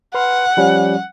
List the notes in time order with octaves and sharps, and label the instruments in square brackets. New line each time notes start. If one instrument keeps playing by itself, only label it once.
[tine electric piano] B4 C6 F6 [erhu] F#5
[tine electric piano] F3 G3 C#4